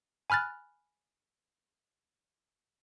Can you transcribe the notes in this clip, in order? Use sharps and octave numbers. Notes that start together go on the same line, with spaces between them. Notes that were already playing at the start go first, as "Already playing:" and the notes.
G#5 B5 F6 F#6 A6